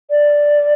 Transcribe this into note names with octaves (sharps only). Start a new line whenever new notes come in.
D5